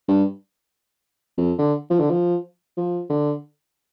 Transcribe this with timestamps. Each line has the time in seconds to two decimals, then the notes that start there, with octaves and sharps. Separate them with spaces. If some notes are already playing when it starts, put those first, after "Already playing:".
0.08 G2
1.37 F2
1.59 D3
1.90 F3
2.00 D3
2.10 F3
2.77 F3
3.10 D3